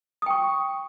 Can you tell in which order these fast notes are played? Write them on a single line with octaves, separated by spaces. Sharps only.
D#6 G5 C#6